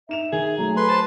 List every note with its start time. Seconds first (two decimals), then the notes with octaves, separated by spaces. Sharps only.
0.09 D#4 E5 E7 F7
0.32 D#3 G#4
0.58 F#3 A3 A#5
0.77 A4 B4 C6
0.89 C5 A5